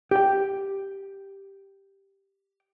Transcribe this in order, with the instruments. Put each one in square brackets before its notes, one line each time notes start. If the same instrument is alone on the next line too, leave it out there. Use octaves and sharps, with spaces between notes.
[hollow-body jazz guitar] G4 G5